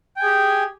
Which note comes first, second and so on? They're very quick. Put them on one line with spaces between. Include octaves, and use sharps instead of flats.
G5 G#5 G#4 G4